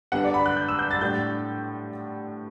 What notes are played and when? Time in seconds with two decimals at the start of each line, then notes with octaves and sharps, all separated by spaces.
0.12 D3 G3 B3 F#5
0.24 D5
0.34 B5
0.46 F#6
0.57 G6
0.69 E6
0.79 G6
0.91 A6
1.01 A2 G3 D4 G6